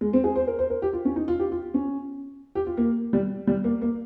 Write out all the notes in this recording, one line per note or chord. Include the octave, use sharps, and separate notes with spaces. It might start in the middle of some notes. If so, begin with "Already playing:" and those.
G#3
C4
G#4
C5
A#4
C5
A#4
G4
F4
C#4
D#4
F4
G4
F4
C#4
G4
F4
A#3
G3
G3
A#3
A#3